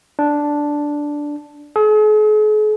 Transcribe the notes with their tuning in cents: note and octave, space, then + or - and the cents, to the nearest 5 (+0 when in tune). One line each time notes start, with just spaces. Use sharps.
D4 -5
G#4 +45